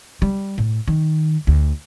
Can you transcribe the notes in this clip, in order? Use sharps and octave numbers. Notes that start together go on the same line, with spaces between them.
G3
A2
D#3
D2